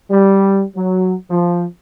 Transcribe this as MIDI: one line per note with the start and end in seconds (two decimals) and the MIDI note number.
0.11 0.62 55
0.77 1.13 54
1.31 1.65 53